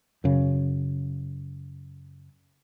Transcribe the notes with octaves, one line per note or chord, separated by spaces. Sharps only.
F#2 C#3